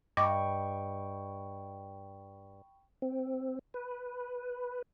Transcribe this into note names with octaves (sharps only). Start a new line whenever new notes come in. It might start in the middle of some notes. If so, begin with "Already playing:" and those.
G2 D#5 G5 B5 C#6 D6
C4
B4